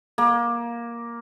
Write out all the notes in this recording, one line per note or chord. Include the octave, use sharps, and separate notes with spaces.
A#3